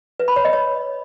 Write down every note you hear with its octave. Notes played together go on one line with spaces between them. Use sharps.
B4
B5
C#5
D#5
C#5